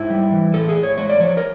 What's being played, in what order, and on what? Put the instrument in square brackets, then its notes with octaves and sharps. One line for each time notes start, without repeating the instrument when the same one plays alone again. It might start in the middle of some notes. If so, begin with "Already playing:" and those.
Already playing: [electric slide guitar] G#2 E4
G3
E3
A2 A4
G#4
A2
C#5
G#3 C#5
D5
F3 C#5
A#4